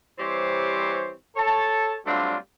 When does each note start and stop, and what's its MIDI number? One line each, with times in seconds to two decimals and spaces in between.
0.19 1.13 52
0.19 1.13 55
0.19 1.13 60
0.19 1.13 67
0.19 1.13 72
0.19 1.13 73
1.36 1.97 69
1.36 1.97 73
1.36 1.97 81
2.06 2.36 54
2.06 2.36 55
2.06 2.36 57
2.06 2.36 60
2.06 2.36 62
2.06 2.36 65